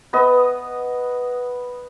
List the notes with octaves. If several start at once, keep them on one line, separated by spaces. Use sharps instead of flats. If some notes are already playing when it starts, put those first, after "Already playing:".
B3 D#5